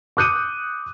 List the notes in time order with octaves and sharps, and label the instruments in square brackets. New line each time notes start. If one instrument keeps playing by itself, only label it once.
[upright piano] D6 D#6 F#6 G6 C#7 D#7